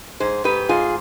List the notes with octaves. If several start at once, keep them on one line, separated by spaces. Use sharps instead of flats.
G#2 G#4 C5
G#2 G4 B4
G#2 F4 G#4